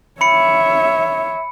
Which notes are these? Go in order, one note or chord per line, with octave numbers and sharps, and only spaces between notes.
C#5 E5 B5 C#7